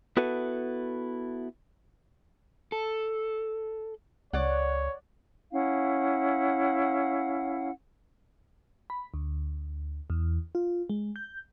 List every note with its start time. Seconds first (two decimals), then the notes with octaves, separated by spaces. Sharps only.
0.17 B3 E4 F#4 A4 B4
2.72 A4
4.33 C#2 C#5 D5 F#5
5.52 C#4 E4 F5 F#5
8.90 B5
9.14 D2
10.10 E2
10.55 F4
10.90 G#3
11.16 G6